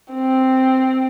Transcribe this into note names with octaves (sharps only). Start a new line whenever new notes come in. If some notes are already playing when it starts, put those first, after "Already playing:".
C4